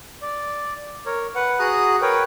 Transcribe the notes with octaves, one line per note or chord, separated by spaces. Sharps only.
D5
A#4 C#5
B4 F#5
F#4 G#4 A#5 D#6 F#6
A#4 B4 C#5 G5